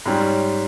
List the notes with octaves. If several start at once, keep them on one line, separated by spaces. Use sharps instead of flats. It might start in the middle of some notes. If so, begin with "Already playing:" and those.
G#2 G3 C#4